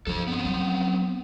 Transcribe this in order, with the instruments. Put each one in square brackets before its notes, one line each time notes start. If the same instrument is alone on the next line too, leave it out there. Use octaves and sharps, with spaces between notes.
[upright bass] G2 F3 [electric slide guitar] A4 C5
[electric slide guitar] B3 C4
[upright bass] F#3